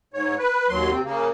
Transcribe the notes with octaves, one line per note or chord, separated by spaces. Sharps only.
G#2 C#5
B4
D#2 F#3 C6
C3 C4
C#3 A#3